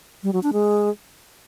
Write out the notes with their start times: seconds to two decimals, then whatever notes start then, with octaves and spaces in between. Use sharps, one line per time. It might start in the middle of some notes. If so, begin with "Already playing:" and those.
0.23 G3
0.33 F#3
0.43 D4
0.53 G#3